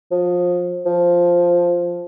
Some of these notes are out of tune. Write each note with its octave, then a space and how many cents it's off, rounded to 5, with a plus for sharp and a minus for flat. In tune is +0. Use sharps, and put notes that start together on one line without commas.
F3 +25
F3 +0